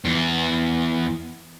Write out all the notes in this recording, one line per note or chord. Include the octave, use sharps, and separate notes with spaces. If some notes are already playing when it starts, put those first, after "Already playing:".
E2